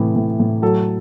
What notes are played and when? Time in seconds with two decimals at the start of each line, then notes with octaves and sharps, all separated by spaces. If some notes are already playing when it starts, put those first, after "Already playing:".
Already playing: A2 C3 E3
0.16 A2
0.40 A2
0.62 F#3 A4